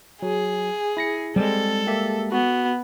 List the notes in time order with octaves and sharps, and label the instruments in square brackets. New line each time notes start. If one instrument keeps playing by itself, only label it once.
[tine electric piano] F#3 [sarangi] G#4
[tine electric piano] E4 A#6 C#7
[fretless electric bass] G3 G#3 [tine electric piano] C4 [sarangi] A4
[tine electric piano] A#3 G4 E5
[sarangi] B3 [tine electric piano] F#4